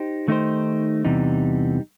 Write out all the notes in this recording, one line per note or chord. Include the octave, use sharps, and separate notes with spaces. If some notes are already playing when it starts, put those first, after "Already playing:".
Already playing: D#4 G4 C5
D#3 A3 D#4 G4 C5
E2 C3 E3 G3 D#4